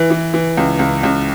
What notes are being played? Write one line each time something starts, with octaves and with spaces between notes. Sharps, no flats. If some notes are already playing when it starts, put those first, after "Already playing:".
Already playing: E3
E3
E3
C#2
C#2
C#2